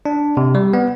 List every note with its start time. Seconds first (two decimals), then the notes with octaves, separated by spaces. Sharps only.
0.06 D4
0.37 C3
0.55 G3
0.73 B3